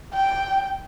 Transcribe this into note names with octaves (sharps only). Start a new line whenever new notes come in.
G5